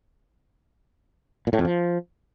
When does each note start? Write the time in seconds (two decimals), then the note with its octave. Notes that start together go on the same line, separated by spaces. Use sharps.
1.47 A#2
1.53 A2
1.59 F2
1.65 F3